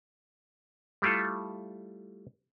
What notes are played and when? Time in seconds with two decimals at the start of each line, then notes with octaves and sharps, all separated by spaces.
1.02 G3 A3 E4 F4 A4